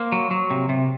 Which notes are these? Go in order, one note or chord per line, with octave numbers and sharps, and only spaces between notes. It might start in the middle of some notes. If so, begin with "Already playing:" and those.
Already playing: A#3 C5
F#3
F#3
C3
C3